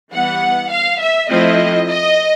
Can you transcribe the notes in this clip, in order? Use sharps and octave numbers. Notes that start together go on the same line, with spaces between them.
E3 G3 B3 F#5
F5
E5
F3 A3 C4 E4 D#5
D#5